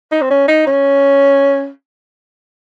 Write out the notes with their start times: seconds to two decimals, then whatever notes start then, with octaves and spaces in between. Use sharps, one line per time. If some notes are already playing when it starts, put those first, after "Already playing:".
0.12 D#4
0.22 C4
0.30 C#4
0.48 D#4
0.67 C#4